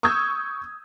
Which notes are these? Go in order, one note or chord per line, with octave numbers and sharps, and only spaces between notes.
C#6 D#6 E6 G6 G#6